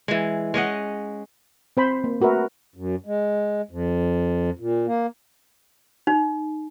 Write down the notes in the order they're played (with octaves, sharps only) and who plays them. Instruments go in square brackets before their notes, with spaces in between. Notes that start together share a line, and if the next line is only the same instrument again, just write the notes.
[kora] E3 G#3
G#3 C#4 D#5 F#5
[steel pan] C4 C5 B5
A#3
A3 F#4 A#4 B4 E5
[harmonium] F#2
G#3
F2
A#2
A#3
[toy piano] D#4